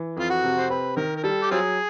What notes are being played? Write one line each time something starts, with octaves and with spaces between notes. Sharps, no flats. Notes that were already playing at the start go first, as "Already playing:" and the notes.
Already playing: E3
F2 F4
F#4
C3
C5
C4 B4
D#3 A#4
A#4
G3 A4
G4
F#3 C4 F4 G#4